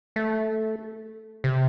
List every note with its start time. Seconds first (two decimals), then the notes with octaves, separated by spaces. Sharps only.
0.16 A3
1.44 C3